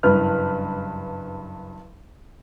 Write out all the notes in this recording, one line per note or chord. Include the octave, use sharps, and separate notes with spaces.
F#1 G2 B4 F6